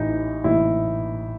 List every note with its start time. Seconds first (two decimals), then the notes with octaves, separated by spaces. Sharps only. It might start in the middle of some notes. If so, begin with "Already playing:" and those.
Already playing: A1 A2 E3 D#4
0.44 A1 A2 E3 E4